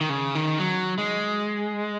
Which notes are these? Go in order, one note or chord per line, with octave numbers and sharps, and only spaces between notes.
D#3
C#3
D#3
F#3
G#3